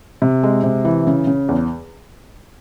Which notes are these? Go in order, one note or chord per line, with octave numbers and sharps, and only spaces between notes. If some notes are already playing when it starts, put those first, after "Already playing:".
C3
G#3
C3
E3
C#3
C#3
E2